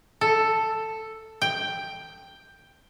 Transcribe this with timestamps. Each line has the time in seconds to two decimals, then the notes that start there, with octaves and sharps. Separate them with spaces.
0.21 A4
1.42 G5